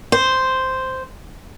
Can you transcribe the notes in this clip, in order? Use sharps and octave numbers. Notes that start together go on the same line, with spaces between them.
C5